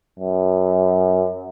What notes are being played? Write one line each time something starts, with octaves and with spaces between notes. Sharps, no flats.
F#2